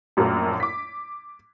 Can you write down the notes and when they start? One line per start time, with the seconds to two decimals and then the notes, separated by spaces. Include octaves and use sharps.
0.17 A#1 F#2 F#3 A3 F4 A#4
0.60 D6 B6